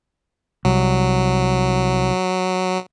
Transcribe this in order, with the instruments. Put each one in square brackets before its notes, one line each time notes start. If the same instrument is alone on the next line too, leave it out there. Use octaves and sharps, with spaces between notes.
[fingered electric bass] C2 [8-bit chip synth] F#3